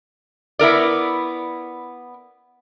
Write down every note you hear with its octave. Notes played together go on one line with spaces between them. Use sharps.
B3 E4 A#4 D5